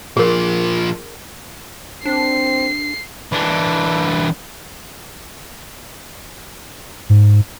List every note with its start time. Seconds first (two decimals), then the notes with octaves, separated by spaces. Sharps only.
0.17 A#2 F3 G#4 A#4
2.06 C4 D4 C7
3.32 E3 D4
7.10 G#2